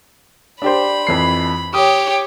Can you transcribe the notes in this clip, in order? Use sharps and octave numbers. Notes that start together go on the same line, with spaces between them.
D4 G4 C5 B5
F2 E3 C7
G4 C#5 D#6